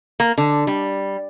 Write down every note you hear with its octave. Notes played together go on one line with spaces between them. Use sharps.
A#3
D3
G3